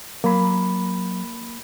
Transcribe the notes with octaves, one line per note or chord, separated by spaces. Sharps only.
F#3 A#3 A#5 B5